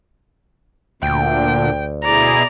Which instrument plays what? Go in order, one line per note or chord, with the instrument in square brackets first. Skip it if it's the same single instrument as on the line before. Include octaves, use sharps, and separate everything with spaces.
[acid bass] D2 [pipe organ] A#2 D3 [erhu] G5
[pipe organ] B2 E4 G#4 [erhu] D5 [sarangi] A#5